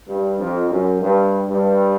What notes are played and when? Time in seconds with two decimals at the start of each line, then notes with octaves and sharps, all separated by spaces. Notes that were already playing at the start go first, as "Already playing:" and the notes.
0.08 G2
0.40 F2
0.71 F#2
1.01 G2
1.48 G2